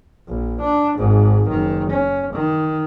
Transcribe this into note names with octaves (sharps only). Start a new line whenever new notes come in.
A#1
D4
G#1 G#2
F#1 D#3
C#4
D#3